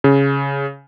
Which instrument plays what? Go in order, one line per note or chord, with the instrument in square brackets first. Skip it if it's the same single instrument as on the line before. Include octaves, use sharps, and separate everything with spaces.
[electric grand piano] C#3